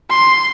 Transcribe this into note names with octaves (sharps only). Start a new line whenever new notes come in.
C6